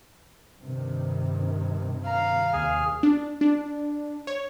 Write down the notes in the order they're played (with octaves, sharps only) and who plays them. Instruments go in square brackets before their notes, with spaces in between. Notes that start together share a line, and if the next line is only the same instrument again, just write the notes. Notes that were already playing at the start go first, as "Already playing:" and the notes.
[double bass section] G2 C3 D#3
[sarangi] F5 [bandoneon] A#5
[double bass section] D#2 C3 [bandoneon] G#4 G#5 F6
[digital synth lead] D4
D4
C#5